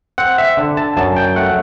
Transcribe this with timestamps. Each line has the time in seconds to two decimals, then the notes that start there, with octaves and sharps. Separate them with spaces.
0.18 C4 F#5
0.38 E5
0.57 D3
0.77 A5
0.97 F#2 A5
1.16 G5
1.36 A3 F#5